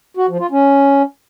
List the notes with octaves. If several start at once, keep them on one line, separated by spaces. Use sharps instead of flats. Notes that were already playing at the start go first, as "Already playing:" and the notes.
F#4
F3
F4
C#4